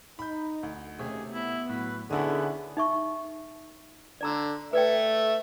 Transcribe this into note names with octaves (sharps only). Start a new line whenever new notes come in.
D#4 B5 G6
D2
D#2 C3 A3 C#4 G4 G#4
B3 E4
A2 F#3 B4
B2 D3 B3 C#4 D#4 E4 G#4 F#5
D#4 E5 C#6
D3 D5 A#5 E6
A3 B4 D5 E5 G5